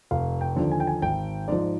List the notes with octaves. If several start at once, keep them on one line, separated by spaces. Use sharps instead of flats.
F1 F5
G5
D#2 D3 F3
G#5
G5
G#5
G#1 G5
G#2 F3 D5